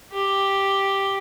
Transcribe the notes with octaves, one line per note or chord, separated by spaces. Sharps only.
G4